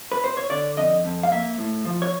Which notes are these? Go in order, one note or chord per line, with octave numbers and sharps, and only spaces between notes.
B4
C5
C#5
D3 D5
F2 D#5
F2
F5
A#3 E5
A2
F3
C#5